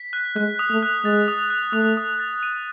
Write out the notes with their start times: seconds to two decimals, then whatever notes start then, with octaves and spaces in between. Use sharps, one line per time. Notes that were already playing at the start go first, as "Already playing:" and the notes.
Already playing: B6
0.13 F#6
0.36 G#3 F#6
0.59 D#6
0.71 A3
0.83 F#6
1.05 G#3 A6
1.28 D#6
1.50 F#6
1.73 A3 D#6
1.97 D#6
2.20 A6
2.43 D#7